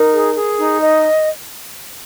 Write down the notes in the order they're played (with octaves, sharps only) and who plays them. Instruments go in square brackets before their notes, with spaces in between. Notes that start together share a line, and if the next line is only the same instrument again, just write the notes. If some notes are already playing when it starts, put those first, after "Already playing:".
Already playing: [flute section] D#4 [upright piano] A#4
[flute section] G#4
G#4
D#4
D#5